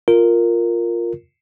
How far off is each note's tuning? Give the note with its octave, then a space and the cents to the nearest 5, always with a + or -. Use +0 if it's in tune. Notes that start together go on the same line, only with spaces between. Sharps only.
F4 +0 A#4 -5